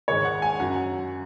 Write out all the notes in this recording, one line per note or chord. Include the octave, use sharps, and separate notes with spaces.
G#2 D#3 G#3 C#5
F#5
G#5
F#2 F#3 F#5